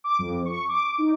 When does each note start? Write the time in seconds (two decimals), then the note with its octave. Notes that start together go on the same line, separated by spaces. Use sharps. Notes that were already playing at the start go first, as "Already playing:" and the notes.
0.04 D6
0.19 F2
0.45 C#6
0.68 D6
0.98 D#4